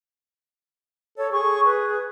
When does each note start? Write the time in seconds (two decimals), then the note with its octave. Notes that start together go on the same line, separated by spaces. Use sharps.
1.18 A4 C#5
1.32 G#4 C#6
1.65 B4